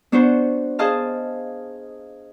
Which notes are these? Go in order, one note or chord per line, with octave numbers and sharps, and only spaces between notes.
B3 D4 F#4 B4 C5
G#4 C5 D#5 F5 A5 F6